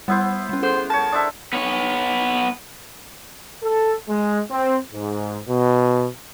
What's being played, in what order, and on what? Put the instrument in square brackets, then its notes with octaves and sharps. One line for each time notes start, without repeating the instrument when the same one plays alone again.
[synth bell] G3 D#6 [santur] B3 E4 C5
[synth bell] G3 C#4
[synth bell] G#4 A4 F#5 [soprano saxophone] C5
[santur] A#4 C#5 [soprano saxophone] A5
[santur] D4 C5 E5 [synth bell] D#6
[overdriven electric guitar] B3 C#5
[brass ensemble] A4
G#3
C4
G#2
B2